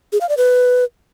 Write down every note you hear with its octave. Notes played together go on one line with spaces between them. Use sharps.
G#4
F5
D5
B4